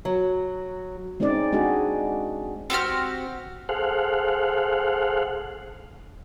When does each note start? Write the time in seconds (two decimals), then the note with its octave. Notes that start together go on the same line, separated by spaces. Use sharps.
0.05 F#3
1.20 G#3 C4 C#4 D#4 D5
1.52 G#3 D4 F#4 G#4
2.70 C4 F#4 G4 F6
3.69 G#4 A4 C5 F5 F#5